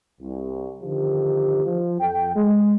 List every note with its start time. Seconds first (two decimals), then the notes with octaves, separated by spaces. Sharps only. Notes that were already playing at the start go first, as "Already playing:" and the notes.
0.21 C2
0.83 D3 D#3 F3 G4
1.66 F3
2.00 F2 A4 G5
2.36 G#3